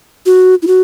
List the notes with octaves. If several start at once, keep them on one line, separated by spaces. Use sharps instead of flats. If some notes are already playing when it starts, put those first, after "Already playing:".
F#4
E4
F#4